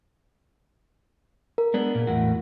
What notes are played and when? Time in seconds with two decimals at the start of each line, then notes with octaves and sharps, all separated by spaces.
1.58 A#4
1.74 G#3 B3 D4
1.95 A#2
2.07 E2 A2 F#4